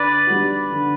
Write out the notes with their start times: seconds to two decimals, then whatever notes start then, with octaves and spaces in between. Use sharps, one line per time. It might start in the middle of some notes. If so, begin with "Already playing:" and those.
Already playing: D3 B4 D5
0.27 G3 D4 F#4
0.71 D3